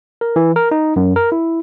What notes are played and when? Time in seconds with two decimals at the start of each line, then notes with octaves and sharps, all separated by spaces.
0.21 A#4
0.36 E3
0.56 A#4
0.71 D#4
0.96 F#2
1.16 A#4
1.32 E4